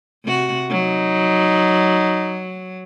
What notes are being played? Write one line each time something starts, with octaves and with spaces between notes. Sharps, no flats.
C3 F#4
F#3 D#4